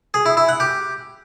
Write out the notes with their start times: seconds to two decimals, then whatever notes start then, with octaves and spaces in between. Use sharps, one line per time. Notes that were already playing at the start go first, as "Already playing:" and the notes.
0.14 G#4
0.26 E4
0.37 E4
0.49 F#5
0.60 G4